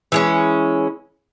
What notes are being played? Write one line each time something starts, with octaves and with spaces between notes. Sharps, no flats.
E3 G#3 C#4